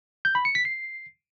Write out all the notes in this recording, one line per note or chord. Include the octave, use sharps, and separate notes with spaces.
G6
B5
C#7
B6
C7